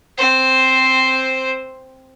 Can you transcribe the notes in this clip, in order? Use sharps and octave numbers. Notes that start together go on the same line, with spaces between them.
C4 C5